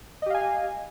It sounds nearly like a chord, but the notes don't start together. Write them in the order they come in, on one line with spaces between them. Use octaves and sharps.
D#5 G4 F5 G#5